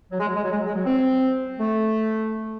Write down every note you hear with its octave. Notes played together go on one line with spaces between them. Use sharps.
F#3
G#3
F#3
G#3
F#3
G#3
F#3
G#3
F#3
C4
A3